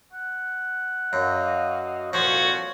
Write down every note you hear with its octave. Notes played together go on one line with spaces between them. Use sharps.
F#5
F#2 F#4 D#5 F5
C2 F2 A#2 F3 F#4 C#5